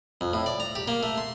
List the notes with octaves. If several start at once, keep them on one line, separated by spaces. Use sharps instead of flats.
F2
A2
D5
A#5
G4
A#3
A3
C6